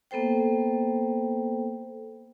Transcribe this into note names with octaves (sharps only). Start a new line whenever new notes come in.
A#3 B3 A4 C5 G5